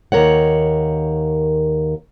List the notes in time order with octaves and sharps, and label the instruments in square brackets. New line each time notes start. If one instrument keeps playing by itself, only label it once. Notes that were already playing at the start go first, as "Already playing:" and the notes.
[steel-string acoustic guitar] D#2 F#3 A#4 C#5 F#5